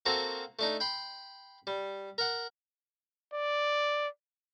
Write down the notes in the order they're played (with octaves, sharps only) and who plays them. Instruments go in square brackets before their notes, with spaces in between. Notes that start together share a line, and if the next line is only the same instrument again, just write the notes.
[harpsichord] A#3 C4 F#4 A4 A#4
A3 D4 D#4
G5 B5 C6
G3
A#4 F#5
[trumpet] D5